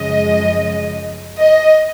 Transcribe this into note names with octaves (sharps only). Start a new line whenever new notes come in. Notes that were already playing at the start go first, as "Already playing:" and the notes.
Already playing: F#2 C#3 F3 G#3 D#5
D#5